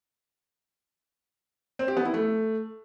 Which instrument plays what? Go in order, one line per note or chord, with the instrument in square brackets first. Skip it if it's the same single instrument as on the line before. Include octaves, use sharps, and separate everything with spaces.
[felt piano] C4
G4
B3
E4
A3